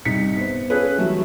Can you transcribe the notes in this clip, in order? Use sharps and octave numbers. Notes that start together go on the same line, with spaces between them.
C2 G2 D#4 B6 C#7
B3 C5
C#4 F4 G#4 A4 B4
E3 F#3 G3 A3 F#4 E5